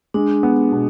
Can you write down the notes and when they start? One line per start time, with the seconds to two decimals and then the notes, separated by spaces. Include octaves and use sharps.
0.14 G#3 D4
0.43 B3
0.72 B2